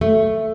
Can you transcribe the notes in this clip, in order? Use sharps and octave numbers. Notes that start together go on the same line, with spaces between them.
A3